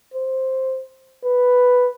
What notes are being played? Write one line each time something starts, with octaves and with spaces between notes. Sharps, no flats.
C5
B4